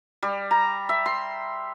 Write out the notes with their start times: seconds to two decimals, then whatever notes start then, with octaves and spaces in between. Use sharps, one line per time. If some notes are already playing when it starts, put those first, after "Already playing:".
0.23 G3
0.51 A#5
0.89 E5
1.06 C6